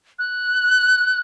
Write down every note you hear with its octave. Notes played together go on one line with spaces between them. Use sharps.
F#6